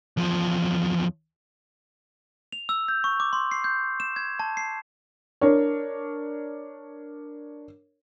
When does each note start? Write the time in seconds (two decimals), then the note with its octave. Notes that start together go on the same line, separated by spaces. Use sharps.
0.17 E2 F3
2.52 F7
2.69 E6
2.88 G6
3.04 C#6
3.20 D6
3.33 C6
3.51 C7
3.64 G6
4.00 E7
4.16 G#6
4.40 A5
4.57 C7
5.41 D4 A#4 C#5